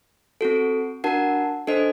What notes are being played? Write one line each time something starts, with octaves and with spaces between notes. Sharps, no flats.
C4 F#4 A4
D4 F#4 A#4 F#5 A5
D4 A4 C5 D#5